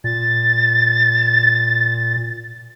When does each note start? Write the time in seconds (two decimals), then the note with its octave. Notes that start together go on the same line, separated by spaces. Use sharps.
0.04 A#2 A6